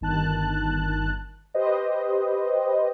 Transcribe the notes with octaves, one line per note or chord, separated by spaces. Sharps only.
G1 D#3 A5 F#6
G4 B4 C5 D#5